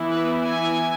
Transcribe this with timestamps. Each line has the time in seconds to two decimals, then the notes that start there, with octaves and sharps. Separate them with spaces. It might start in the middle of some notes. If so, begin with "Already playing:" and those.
Already playing: E3 B3 E4
0.11 B4
0.41 G#5